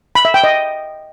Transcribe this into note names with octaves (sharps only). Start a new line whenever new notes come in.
B5
E5
G5
D#5